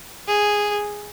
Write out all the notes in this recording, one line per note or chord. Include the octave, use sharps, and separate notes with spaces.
G#4